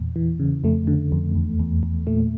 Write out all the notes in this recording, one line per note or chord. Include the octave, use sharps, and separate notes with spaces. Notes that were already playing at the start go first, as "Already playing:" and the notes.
Already playing: E2 A#2
E3
C#3
F2 A3
D3
F2
E2
E2
E2
A#2 A3